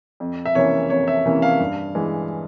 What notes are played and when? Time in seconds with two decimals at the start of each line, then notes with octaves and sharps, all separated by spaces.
0.20 F2
0.46 E5
0.55 C3 E3 A#3 C#4 C#5
0.90 F2 C#5
1.08 E5
1.25 C3 E3 A#3 C#4
1.42 F5
1.60 G2
1.95 E3 G#3